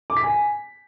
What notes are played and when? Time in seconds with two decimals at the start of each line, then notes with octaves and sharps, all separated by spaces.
0.10 D6
0.17 B6
0.23 G#5